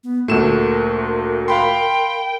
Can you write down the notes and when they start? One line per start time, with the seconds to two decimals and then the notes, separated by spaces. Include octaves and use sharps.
0.04 B3
0.28 D2 A#2 A3 A#4 E7
1.48 F5 G5 B5 C6